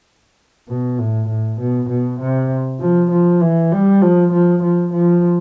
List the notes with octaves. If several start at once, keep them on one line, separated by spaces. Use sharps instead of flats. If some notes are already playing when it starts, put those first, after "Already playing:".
B2
A2
A2
B2
B2
C3
F3
F3
E3
G3
F3
F3
F3
F3